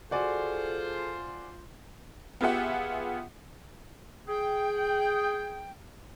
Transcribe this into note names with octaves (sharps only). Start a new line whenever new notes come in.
F4 F#4 G#4 A4 C5 D5 G#5
B3 F4 G4 G#4 E5 F#5
G#4 G5